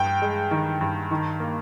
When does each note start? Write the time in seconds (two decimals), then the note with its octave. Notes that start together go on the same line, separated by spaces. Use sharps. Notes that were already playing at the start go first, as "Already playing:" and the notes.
Already playing: G2 G5
0.22 G#3
0.51 D#3
0.81 G2
1.11 D#3
1.40 A#3